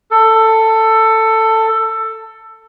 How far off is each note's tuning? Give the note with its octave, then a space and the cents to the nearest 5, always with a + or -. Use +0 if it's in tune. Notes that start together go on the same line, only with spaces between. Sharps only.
A4 +15